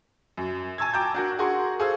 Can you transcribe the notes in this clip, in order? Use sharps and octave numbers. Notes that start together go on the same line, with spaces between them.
F#2
G#5 A5 C#6 E6 G#6
G5 A5 A#5 D6 E6 G6
D4 F#4 A#4
F#4 G#4 A#4 F#5 C6 C#6
G#4 A4 C5 F5 E6